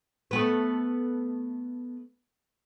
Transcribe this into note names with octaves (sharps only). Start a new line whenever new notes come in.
A3 B3 B4